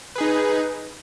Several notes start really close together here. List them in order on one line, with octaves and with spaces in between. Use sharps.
B4 G#4 D#4